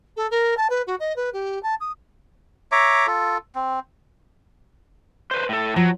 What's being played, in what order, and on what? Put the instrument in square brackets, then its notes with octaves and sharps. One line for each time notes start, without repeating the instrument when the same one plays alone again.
[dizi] A4
A#4
A5
B4
F#4
D#5
B4
G4
A5
D#6
[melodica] C#5 E5 A#5 D6
F4 A4
C4
[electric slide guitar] B4 C5
A2 A4
[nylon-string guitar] F3 [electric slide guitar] F#3